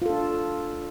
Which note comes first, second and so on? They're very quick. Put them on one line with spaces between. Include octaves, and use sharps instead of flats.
F4 A4 D4